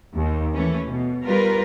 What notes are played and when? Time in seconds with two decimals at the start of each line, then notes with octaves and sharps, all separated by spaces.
0.15 D#2
0.54 E3 A3 C#4
0.88 B2
1.25 G3 F4 A#4 B4